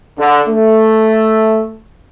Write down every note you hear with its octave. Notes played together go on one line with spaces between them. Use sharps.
D3
A3